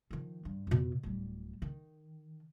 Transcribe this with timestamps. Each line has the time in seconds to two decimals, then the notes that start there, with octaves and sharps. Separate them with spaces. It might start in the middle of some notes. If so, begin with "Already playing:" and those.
0.11 D#3 F3
0.45 G2
0.67 F2 B2
1.03 D1 G3
1.62 D#3